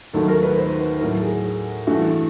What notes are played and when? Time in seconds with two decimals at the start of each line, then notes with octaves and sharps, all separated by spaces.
0.13 D#2 D#3 F#3 A3 A4
0.28 A#4
0.43 B4
0.58 C5
0.79 B4
1.01 A2 F#3 A3 A#4
1.22 G#4
1.87 G2 E3 A3 F#4